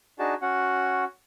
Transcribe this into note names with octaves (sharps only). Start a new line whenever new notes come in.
D4 D#4 F#4 G#4 A5
C#4 F#4 F#5